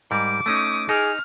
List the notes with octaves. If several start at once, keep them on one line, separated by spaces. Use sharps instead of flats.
G#2 G3 A#4 D6
A3 C#4 D#4 D#6
D#4 G#4 F6